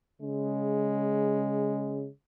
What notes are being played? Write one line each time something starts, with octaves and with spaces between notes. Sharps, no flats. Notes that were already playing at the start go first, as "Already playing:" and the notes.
C#3 G#3